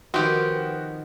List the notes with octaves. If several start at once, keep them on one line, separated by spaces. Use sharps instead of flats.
D#3 F3 B3 C4 F#4 G4 B4